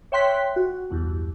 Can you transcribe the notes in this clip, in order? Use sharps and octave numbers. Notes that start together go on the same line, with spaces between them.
C#5 E5 G5 C6 F#6 B6
F#4
B1 E2 G2